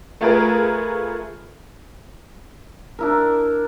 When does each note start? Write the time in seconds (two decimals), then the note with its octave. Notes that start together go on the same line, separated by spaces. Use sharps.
0.21 A3 F4 G#4 A#4 B4
2.99 D4 E4 A#4